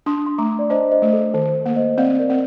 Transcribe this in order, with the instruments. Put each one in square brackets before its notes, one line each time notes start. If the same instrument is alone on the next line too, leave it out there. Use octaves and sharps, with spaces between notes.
[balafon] D4 [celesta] C6 D#6
[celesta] C6
[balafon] A3 [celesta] A#5 D6
[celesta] D5
[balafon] D4 [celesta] C5 D#5
[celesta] C5 D#5
[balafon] A3
[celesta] A4
[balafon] D#3 [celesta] C5
[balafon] A#3
[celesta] C5 D#5
[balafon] C4 [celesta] D5 F5
[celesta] A#4 D5
[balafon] C4